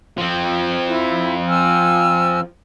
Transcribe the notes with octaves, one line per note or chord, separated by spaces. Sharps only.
F3 C4
E4
G#5 E6 F6